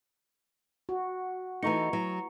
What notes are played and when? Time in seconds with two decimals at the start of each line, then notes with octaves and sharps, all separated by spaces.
0.89 F#4
1.63 E3 A3 D#4 A#5 C#6 C#7
1.93 F#3